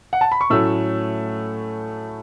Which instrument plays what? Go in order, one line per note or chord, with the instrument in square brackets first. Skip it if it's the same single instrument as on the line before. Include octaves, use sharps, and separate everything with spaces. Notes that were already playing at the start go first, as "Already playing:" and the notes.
[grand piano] F#5
A5
B5
C#6
A2 F#3 A3 C#4 E6